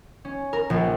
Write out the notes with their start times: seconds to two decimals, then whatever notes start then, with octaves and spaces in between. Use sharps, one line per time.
0.25 C#4
0.53 A#4
0.70 A#1